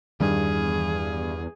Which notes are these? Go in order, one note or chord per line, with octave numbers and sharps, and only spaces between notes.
E2 G2 D#3 G3 G#4